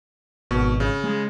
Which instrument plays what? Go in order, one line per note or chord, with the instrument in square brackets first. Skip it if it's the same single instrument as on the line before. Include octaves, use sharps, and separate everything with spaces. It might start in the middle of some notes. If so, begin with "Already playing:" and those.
[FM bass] G#1 [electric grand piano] B2 C#6
[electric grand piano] C#3
[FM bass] G#3